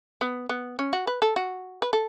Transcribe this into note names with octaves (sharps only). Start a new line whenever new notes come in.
B3
B3
C#4
F#4
B4
A4
F#4
B4
A4